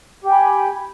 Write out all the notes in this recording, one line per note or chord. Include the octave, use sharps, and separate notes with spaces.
G4 G5 G#5 B5